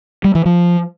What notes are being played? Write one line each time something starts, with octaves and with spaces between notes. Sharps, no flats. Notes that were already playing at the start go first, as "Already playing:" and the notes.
G3
E3
F3